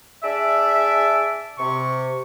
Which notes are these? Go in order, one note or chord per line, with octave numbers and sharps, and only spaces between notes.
D4 G#4 D5 E5
C3 C#6